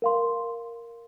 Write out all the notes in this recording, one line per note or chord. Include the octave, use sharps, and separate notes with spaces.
A#4 F5 C6